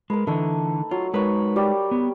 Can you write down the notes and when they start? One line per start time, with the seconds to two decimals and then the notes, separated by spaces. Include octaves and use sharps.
0.10 G#3 A#4 B4
0.27 D3 E3 A3 D#4
0.91 F#3 F4
1.14 G#3 D#4 A#4 B4 C#5
1.56 G3 G4 G5
1.91 B3